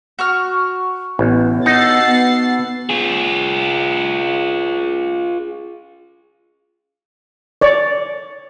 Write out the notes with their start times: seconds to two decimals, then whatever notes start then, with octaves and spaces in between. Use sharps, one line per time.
0.19 F#4 C#6 F6
1.19 A1 B3
1.66 D#4 F#4 A4 F#5 A6 C7
2.05 B3
2.89 F4 G#4
7.61 C#5 D5